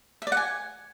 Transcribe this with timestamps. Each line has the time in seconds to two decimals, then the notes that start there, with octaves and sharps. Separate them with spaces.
0.22 E5
0.27 D5
0.32 F#5
0.37 G#5